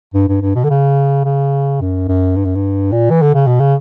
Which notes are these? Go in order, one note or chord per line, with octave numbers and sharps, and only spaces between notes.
G2
G2
G2
B2
D3
C#3
C#3
F#2
F#2
G2
F#2
G2
A#2
E3
D3
C#3
B2
C#3